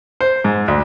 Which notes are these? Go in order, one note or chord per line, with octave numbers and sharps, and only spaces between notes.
C5
G#2
D2